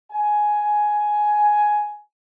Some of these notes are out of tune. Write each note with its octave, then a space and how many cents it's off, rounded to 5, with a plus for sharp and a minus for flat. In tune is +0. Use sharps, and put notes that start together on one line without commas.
G#5 +10